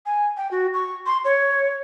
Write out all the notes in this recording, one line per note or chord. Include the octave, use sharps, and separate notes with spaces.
G#5
G5
F#4
C#6
C6
C#5